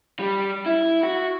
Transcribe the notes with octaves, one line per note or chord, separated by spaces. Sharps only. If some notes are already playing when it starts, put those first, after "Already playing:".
G3
E4
F#4